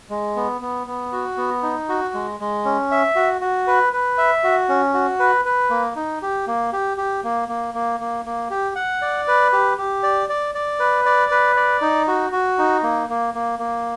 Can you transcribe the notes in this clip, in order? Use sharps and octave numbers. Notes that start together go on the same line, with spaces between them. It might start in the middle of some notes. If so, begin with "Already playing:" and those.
G#3
B3
B3
B3
F#4
B3
D#4
F#4
G#3
G#3
C#4
E5
F#4
F#4
B4
B4
E5
F#4
C#4
F#4
B4
B4
A#3
D#4
G4
A#3
G4
G4
A#3
A#3
A#3
A#3
A#3
G4
F#5
D5
B4
G4
G4
D5
D5
D5
B4
D5
B4
D5
D#4
F#4
F#4
D#4
A#3
A#3
A#3
A#3